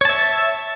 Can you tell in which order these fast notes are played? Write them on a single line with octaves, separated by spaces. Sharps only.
C#5 A5 E5